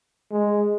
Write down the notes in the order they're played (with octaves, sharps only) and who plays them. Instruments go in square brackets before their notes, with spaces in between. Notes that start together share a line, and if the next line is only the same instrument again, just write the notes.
[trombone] G#3